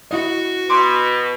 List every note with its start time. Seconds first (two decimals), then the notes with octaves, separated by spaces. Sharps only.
0.11 E4 F#4 D#5
0.70 B2 C6 D6